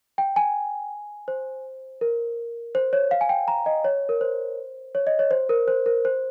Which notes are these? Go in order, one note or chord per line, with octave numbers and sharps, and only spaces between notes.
G5
G#5
C5
A#4
C5
C#5
F5
G#5
G5
A#5
D#5
C#5
A#4
C5
C#5
D#5
C#5
C5
A#4
C5
A#4
C5